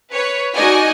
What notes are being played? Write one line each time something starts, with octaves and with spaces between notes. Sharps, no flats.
B4 C#5
D#4 F#4 D5 D#5 G#5